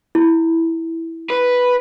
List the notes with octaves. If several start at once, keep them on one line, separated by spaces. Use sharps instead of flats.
E4
B4